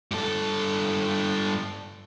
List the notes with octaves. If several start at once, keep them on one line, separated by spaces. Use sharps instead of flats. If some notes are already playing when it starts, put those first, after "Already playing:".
G2 A4